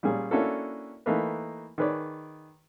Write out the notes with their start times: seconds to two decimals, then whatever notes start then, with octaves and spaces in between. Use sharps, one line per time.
0.03 A#2 G3 C#4 G#4
0.31 A#3 C#4 D4 E4 F#4 A4
1.06 E3 A3 A#3 D#4 B4
1.78 D#3 G#4 B4 C#5 D5